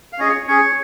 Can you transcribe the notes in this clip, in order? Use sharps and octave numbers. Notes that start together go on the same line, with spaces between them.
F5
C#4 G#4 D#5
C#5
C#4 G#4 C#5